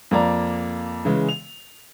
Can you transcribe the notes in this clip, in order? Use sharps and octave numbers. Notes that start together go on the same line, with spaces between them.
F2 A#3 D5 A#5
C#3 E3 G#3
F7